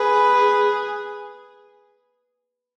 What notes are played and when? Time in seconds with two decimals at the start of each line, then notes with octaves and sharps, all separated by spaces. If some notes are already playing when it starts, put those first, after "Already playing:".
Already playing: G#4 B4
0.35 G#4